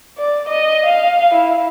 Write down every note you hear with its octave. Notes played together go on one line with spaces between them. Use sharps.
D5
D#5
F5
E4